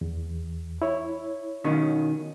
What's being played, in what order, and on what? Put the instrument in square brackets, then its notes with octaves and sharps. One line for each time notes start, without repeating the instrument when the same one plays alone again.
[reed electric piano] E2
E4 C#5
[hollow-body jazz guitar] B2 D#3 C#4